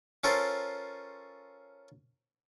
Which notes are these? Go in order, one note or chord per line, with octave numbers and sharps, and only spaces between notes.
C#4 F4 A4 A#4 C5